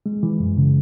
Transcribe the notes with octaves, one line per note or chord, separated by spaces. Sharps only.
G#3
E3
F#2
C#3